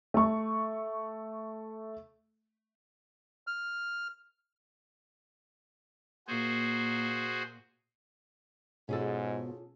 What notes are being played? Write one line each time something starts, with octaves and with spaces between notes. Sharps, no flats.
A3 C#6
F6
A#2 A#3 F#4 G#4 C5
G#2 B2 C#4 F4 G#4 A4